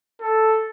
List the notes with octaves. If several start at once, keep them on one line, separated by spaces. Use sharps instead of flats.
A4